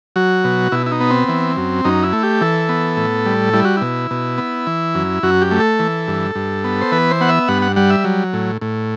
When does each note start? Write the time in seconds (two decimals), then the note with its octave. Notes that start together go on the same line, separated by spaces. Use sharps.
0.16 F#3 F#4
0.44 B2
0.72 B2 E4
0.86 E4
0.92 D#4
1.00 B3
1.10 C4
1.29 E3
1.57 F#2
1.85 F#2 D#4
2.03 E4
2.13 A3
2.23 G4
2.41 E3 A4
2.69 B3
2.97 A2
3.26 G3
3.53 G3 E4
3.65 F#4
3.77 B2 E4
4.11 B2
4.38 B3
4.67 E3
4.95 F#2
5.23 F#2 F#4
5.42 G4
5.51 A3
5.60 A4
5.79 E3
6.08 G2
6.35 G2
6.64 B3
6.81 C5
6.92 E3 B4
7.11 C5
7.21 B3 F#5
7.29 E5
7.48 G2 F#5
7.62 F#5
7.76 G3 F#5
7.90 E5
8.04 F#3
8.33 A2
8.61 A2